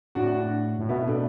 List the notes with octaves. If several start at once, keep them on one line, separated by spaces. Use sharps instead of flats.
A2 D4 F#4
A2
B2 B3 E4
A3 D4